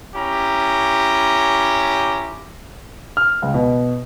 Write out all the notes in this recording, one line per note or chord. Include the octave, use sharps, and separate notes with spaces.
C#4 E4 G4 A#5
F6
C#2
B2